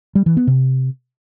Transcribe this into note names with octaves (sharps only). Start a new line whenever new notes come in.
G3
E3
B3
C3